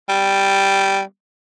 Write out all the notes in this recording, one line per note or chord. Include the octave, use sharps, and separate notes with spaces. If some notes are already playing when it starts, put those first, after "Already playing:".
G3